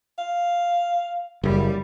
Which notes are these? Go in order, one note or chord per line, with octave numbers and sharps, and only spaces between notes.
F5
F#1 G3